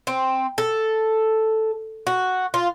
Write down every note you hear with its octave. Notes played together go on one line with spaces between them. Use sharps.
C4
A4
F#4
F4